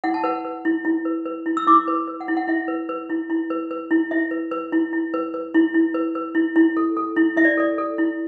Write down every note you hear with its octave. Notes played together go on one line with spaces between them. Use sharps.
E4 F#5
A5
B4 F#5
B4
E4
E4
B4
B4
E4
E6
E4 D6
B4
B4
F#5
E4
F#5
E4 E5
B4
B4
E4
E4
B4
B4
E4
E4 E5
B4
B4
E4
E4
B4
B4
E4
E4
B4
B4
E4
E4
A4
A4
E4
E4 E5
D5
A4 D5
A4
E4